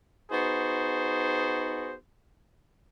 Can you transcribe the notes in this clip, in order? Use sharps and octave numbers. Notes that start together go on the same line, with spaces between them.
B3 D#4 F#4 G#4 C5